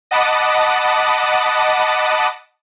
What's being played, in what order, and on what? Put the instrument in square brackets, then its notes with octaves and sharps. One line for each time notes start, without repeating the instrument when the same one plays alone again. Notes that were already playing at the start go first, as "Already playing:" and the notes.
[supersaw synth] D#5 F#5 A5 B5 D6 D#6